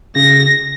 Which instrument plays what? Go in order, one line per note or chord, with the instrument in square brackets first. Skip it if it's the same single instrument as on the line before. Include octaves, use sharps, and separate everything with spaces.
[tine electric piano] C#3 [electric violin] A#6